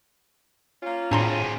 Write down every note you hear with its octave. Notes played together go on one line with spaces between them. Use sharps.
A#3 C#4 F4
A2 C4 D4 G#4 A#5 C6